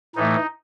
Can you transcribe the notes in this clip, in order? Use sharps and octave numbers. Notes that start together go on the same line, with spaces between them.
A2 E3 A3 D#4